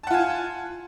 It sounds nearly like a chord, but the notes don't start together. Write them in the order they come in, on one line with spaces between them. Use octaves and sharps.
A5 F#5 F4 G#5